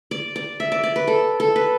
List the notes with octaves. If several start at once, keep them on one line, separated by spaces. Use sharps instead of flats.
D5
D5
E5
D5
D5
B4
A4
A4
B4